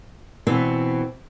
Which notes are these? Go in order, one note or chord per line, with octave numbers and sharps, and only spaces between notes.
B2 E3 B3 C4